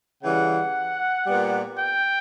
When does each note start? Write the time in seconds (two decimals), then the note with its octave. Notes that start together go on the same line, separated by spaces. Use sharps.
0.23 C#3 E3 G3 F#5
1.26 A#2 G3 B3
1.77 G5